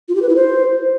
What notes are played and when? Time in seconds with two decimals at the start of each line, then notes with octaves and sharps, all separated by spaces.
0.09 F4
0.15 G4
0.22 B4
0.29 E4
0.36 C5